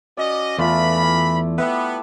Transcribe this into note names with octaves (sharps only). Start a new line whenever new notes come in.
C#4 F#4 D5 D#5
E2 E3 A3 F4 D5 B5
E4
B3 G4 E5